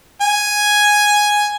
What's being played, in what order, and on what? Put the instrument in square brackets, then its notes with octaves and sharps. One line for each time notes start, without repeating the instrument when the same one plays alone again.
[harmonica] G#5